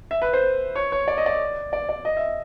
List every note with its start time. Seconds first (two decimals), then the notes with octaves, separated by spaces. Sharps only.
0.11 E5
0.22 B4
0.33 C5
0.75 C#5
0.92 C#5
1.08 D5
1.18 D#5
1.26 D5
1.73 D5
1.89 D5
2.05 D#5
2.17 E5